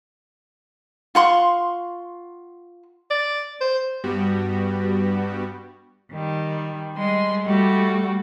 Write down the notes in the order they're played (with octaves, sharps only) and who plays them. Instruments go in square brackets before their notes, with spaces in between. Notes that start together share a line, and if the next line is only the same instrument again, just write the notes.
[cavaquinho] F4 F#5 C6 C#6
[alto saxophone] D5
C5
[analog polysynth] G2 G3 B3 F#4 G4
[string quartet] D#3 G3
G3 G#3 C6
G3 A3 F#4 G4